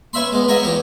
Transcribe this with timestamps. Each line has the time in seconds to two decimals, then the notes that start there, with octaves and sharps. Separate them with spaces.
0.13 C#4 B4 C#5 E5 B5 C6
0.32 G#3 B3
0.48 G#4 A#4 C#5 D#5 E5 F#5
0.63 E2 G4 C#5 G5